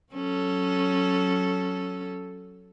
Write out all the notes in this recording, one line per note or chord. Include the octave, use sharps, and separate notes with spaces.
F#3 C#4 A4